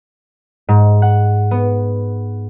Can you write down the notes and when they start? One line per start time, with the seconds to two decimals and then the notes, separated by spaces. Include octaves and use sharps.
0.69 G#2
1.02 F#5
1.51 B3